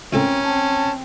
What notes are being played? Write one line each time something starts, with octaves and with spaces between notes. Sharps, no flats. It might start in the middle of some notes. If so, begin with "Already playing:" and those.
C#2 A2 C4 C#4 A4 A#4
C4 A5